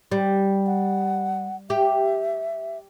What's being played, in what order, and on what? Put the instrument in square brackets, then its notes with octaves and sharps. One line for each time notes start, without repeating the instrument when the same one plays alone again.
[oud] G3
[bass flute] F#5
[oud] G4 [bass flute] E5